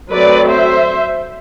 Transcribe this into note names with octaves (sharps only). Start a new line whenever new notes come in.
F#3 A3 C4 B4 D5
C5 E5